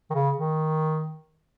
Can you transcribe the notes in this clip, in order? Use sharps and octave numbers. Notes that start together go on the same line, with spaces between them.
D#3
C#3
D#3